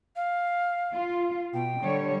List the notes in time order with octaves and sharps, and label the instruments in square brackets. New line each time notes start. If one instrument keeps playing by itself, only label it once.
[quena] F5
[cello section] F4
[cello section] B2 [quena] G5
[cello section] D3 G3 C#5